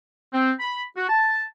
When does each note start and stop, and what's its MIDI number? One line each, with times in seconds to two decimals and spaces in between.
0.32 0.52 60
0.60 0.83 83
0.96 1.06 66
1.09 1.44 81